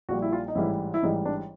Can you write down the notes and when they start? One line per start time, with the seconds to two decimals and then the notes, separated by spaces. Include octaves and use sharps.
0.09 A#1 A#2 G3 F#4
0.22 E4
0.33 F4
0.48 D#4
0.55 A1 G#2 E3 G3 E4
0.94 E4
1.03 A1 G#2 E3 G3 D#4
1.25 D4